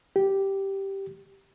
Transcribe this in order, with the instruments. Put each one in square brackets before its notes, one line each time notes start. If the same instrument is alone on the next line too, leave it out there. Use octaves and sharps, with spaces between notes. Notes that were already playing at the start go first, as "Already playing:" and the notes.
[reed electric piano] G4